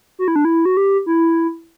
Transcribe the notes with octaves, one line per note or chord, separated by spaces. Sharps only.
F#4
E4
D4
E4
F#4
G4
E4